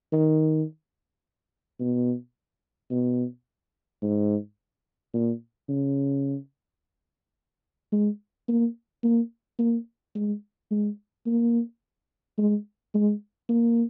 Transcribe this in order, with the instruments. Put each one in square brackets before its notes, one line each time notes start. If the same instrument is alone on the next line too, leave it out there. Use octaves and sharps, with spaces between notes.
[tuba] D#3
B2
B2
G#2
A#2
C#3
G#3
A#3
A#3
A#3
G#3
G#3
A#3
G#3
G#3
A#3